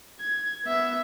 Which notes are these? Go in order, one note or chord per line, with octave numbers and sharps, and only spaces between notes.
G#6
B3 E5